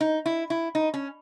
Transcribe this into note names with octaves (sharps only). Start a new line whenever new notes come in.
D#4
E4
E4
D#4
C#4